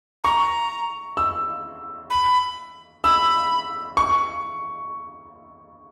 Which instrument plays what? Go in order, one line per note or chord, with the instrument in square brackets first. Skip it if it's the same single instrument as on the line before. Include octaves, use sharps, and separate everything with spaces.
[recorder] A#5 [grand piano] C#6
[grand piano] E6
[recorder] B5
[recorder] B5 [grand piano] E6
[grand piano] C#6